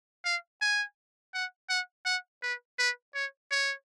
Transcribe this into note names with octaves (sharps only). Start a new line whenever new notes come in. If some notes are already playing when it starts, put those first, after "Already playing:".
F5
G#5
F#5
F#5
F#5
B4
B4
C#5
C#5